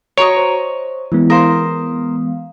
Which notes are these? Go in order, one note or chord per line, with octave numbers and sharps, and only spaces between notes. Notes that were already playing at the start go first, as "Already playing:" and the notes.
F#4 C#5 D#5 A#5 C#6 D7
C5
E3 G#3 B3 E4
A#4 C5 F5 D#6